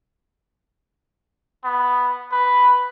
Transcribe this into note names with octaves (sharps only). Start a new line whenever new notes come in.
B3
B4